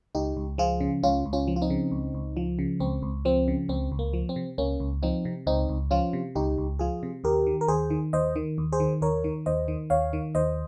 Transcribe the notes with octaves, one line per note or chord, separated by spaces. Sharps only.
C#2 D#4 G4
C#2
F3 F4 G#4
C#3
C#2 C#4 F4
C#2
C#4 F4
F3
F4
C4 D#4
C#3
C#2
C#2
F3
C#3
C#2 C4
C#2
F3 C4
C#3
C#2 C4
C#2
A#3
F3
C4
C3
C#2 A#3 C#4
C#2
F3 C4 D#4
C3
C#2 C4 D#4
C#2
F3 C#4 F4
C3
C#2 D#4 G4
C#2
F3 F4 G#4
C3
D#2 G4 A#4
D#3
A#4
D#2 G#4 C5
D#3
D#2 C5 D#5
D#3
D#2
G#4 C5
D#3
D#2 A#4 C#5
D#3
D#2 C5 D#5
D#3
D#2 C#5 F5
D#3
D#2 C5 D#5